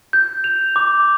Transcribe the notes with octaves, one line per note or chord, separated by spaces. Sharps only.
G6
F7
D6